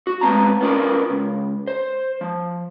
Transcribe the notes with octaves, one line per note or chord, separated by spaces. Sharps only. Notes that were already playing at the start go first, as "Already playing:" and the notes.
F#4
G#3 A3 B3 C4 A5 A#5
B3 C#4 D4 F4 A#4
C#2
C5
F3